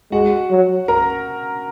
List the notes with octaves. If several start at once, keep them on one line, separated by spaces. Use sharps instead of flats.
G#3 F#4 F#5
F#3
A#4 A#5